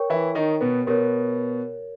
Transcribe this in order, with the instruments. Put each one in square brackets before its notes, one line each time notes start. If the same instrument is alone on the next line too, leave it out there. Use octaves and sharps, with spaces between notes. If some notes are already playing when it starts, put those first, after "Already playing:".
Already playing: [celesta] A#4 C#5 G5 C#6
[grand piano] E3 E4
D#3 D#4
B2 B3
[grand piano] B2 B3 [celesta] G4 A#4 C#5